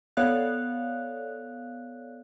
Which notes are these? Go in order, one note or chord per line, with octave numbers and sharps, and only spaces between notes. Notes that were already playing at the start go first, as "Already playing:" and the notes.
B3 A4 C#5 D5 F5 F#6